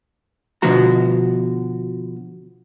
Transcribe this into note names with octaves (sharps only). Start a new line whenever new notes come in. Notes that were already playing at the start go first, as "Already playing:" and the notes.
B2 D3 F3 B3 F#4 A#5